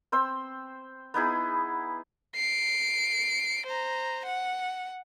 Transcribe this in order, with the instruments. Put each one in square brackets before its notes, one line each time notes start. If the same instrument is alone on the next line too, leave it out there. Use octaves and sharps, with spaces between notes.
[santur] C4 C5 E6
B3 D#4 E4 G#4
[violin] C7 D7
C5 A#5
F#5